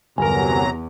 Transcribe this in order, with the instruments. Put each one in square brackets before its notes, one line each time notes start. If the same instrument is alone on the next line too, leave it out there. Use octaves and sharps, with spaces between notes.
[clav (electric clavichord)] G1 A#4 [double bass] E2 [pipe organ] C3 F#3 A#5 [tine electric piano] G#5